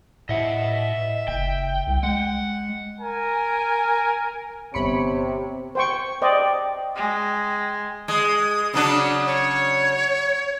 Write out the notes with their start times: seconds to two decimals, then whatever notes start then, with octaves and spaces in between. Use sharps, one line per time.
0.29 A2 D#5 E5 F#5
1.28 F#1 G5
1.87 C2
2.03 G#3 F#5
3.01 A#4 G#5
4.74 G1 C3 B3 C#5 B5 C#7
5.75 C5 G5 C#6
6.22 C5 D5 D#5 G5
6.95 G#3
8.08 G#3 D#6
8.74 C#3 F#3 D4 D#6
9.26 C#5